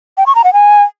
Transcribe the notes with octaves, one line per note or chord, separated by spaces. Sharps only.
G5
C#6
A#5
F#5
G#5